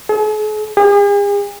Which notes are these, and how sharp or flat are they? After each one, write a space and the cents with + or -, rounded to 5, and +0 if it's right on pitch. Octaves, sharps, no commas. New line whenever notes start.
G#4 +45
G#4 -45